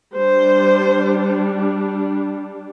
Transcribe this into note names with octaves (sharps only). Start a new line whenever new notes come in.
G3 D4 C5